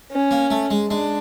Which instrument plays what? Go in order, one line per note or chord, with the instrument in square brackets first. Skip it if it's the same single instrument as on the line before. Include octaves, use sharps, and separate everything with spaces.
[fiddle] C#4
[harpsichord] A#3
A3
G#3
[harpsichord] G#3 [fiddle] D4